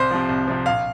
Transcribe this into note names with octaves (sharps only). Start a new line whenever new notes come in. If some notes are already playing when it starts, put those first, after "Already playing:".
Already playing: C2 C5
C3 F3
C2
C3 F3
A#1 F5